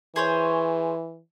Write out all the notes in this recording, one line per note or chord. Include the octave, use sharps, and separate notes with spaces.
E3 G#4 C5 C#5